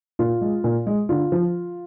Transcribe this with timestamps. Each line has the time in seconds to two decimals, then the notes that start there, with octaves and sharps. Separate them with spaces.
0.19 A#2 F4
0.41 G#3
0.64 A#2
0.87 G#3
1.09 D3 F4
1.32 F3